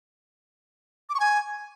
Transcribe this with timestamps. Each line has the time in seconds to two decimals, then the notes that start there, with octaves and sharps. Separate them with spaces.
1.09 D6
1.15 C#6
1.20 G#5